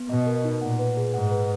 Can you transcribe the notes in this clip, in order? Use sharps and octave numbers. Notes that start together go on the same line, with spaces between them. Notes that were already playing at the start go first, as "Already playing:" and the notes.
Already playing: B3
B2 D#5
A#4
D#4
A#2 F#5
B4
G#4
G#2 F#5
B4